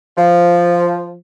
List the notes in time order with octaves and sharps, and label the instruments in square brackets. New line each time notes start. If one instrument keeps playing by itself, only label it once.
[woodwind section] F3